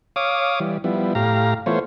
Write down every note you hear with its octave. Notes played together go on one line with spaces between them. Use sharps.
C#5 F5 D6 D#6
E3 G3
F3 G3 B3 E4
A2 G4 F5 A#5
E3 A3 B3 F4 C5 C#5